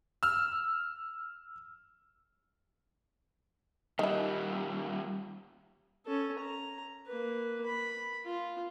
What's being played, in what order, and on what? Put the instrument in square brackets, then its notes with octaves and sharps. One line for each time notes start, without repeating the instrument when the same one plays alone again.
[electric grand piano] E6 F6
[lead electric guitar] D#2 G3 [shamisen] D#3 E4
[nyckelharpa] C#4 A4
A#5
A#3 B4
B5
F4